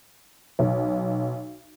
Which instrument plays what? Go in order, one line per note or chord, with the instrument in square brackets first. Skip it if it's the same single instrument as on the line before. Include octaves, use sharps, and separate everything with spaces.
[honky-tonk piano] B1